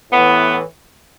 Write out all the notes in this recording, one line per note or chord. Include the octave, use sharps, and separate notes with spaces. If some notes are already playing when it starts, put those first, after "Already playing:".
A2 E3 B3